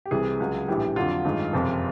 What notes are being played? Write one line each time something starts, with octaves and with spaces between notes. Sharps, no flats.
G4
C2 C3 E3 G3 G#4
C#2 C#3 F#3
A#1 A2 E3 G3 G4
F2 D3 F#3 F4
A1 G2 D#3 G#3
F#1 F2 C3 F3